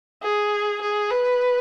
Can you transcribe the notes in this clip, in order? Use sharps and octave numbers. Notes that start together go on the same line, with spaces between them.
G#4
G#4
B4